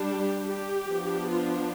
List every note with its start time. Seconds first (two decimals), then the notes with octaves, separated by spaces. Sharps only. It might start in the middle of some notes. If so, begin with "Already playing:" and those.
Already playing: G3 D4
0.12 G4
0.51 G4
0.90 F3 B3 D4
1.29 F4